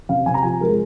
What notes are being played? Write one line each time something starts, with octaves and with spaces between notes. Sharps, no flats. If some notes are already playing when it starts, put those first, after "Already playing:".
C3 F5
C3 G#5
A#5
F3 G#5
G#3 A#4
G#4